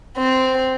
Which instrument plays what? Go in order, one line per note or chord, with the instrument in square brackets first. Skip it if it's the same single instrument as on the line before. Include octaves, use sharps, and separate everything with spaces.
[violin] C4